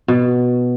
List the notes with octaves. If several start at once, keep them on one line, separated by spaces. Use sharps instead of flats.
B2